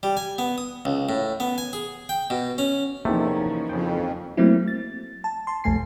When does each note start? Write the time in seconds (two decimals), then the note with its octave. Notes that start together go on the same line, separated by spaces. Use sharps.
0.03 G3
0.17 G#5
0.38 B3
0.58 D#6
0.85 C#2
1.09 A2
1.40 B3
1.58 G#5
1.73 G#4
2.09 G5
2.30 B2
2.58 C#4
3.05 E2 C3 E3 F3 A3 A#3 C#4 D#4
3.69 F2 C#3 G5
4.37 F#3 A3 A#3 C4 E4
4.68 A6
5.24 A5
5.47 A5 C6
5.64 B1 F2 A3 G#5 C7